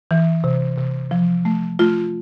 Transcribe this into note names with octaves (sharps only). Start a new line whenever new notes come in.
E3
C3
C3
F3
A3
A3 F4